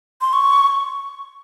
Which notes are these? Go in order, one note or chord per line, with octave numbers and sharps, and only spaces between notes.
C6
C#6